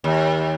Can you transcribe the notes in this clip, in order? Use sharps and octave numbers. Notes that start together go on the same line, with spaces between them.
D#2